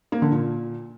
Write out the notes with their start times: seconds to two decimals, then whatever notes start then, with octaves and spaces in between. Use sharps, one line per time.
0.12 A#3
0.22 D3
0.32 A#2